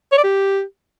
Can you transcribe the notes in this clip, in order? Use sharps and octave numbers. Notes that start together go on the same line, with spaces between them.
C#5
D5
G4